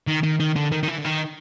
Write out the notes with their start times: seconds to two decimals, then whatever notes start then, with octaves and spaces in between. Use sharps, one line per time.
0.07 D#3
0.23 D#3
0.40 D#3
0.56 D3
0.72 D#3
0.83 D#3
0.88 E3
0.98 D3
1.05 D#3